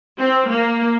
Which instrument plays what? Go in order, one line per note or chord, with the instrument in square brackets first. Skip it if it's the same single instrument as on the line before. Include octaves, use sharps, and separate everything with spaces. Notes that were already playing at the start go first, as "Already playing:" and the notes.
[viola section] C4
A#3